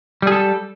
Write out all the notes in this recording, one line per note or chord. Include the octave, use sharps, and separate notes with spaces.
G3 G#4 A4